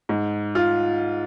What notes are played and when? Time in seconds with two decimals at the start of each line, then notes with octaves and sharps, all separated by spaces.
0.09 G#2
0.55 F4